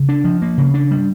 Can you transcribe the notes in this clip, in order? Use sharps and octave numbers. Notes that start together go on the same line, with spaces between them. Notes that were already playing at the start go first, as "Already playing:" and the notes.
Already playing: C#3
D4
F3
A#3
C#3
D4
G3